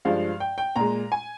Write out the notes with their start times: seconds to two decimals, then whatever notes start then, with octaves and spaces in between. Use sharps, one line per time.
0.05 G2 F3 G#3 F5
0.40 G5
0.58 G5
0.76 A#2 G#3 A#5
1.12 G#5